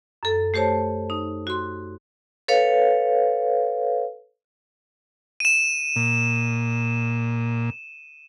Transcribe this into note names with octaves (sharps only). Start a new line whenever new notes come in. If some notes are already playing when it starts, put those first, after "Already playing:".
F#2 A4
A3 G4 C5 C#5 A5
D#4
F#4 C6
A4 B4 C#5 F5
D#7 E7
A#2